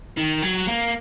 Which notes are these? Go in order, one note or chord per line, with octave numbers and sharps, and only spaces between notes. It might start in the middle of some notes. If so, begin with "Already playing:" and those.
D#3
F#3
A#3